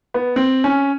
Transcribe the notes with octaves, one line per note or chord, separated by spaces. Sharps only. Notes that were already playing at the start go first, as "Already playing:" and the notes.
B3
C4
C#4